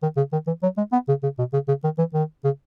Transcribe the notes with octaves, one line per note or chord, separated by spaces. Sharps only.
D#3
C#3
D#3
E3
F#3
G#3
B3
C#3
C#3
B2
C#3
C#3
D#3
E3
D#3
C#3